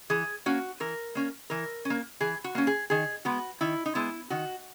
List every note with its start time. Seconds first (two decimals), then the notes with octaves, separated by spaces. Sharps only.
0.10 E3 G#4
0.46 A#3 C#4 F#4
0.80 E3 A#4
1.15 A#3 C#4
1.50 E3 A#4
1.85 C#4
1.90 A#3
2.21 E3 G#4
2.44 F#4
2.55 A#3 C#4
2.67 G#4
2.90 D#3 G#4
3.25 G#3 B3 F#4
3.61 D#3 E4
3.86 D#4
3.95 G#3 B3 E4
4.30 D#3 F#4